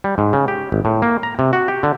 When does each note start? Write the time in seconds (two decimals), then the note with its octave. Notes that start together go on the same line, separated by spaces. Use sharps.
0.04 G3
0.18 G#2
0.33 C#3
0.48 G4
0.72 G#1
0.85 A2
1.02 A#3
1.23 A#5
1.39 C3
1.53 F#4
1.68 G4
1.83 D3